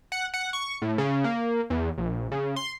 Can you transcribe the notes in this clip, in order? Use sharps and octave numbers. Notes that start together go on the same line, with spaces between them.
F#5
F#5
C#6
A2
C#3
A#3
E2
A#1
C#3
C6